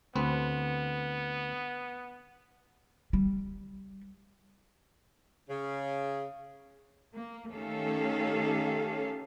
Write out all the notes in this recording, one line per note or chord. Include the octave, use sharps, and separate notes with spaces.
D2 B3 C4 B4
G3
C#3
A#3
D#3 A3 C#4 G4 A4 F5